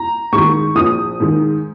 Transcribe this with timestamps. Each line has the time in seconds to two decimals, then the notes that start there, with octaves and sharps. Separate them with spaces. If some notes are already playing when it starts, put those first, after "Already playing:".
Already playing: A#5
0.33 G#2 D#3 C#6
0.76 A#1 D#6
1.20 G#2 D#3